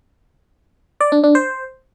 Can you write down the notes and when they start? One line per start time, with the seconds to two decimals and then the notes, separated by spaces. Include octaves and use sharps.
1.01 D5
1.12 D4
1.23 D4
1.35 C5